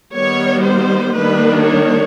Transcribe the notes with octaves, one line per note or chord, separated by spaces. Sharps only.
D#3 G3 B3 C#5
C5
D#3 G3 A#3 D4 B4
C#5